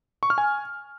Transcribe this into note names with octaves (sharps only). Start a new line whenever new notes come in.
C#6
F6
G#5